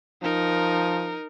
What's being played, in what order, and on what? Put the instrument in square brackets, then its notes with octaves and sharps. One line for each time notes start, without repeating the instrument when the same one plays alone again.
[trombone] F3 [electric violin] D#4 A#4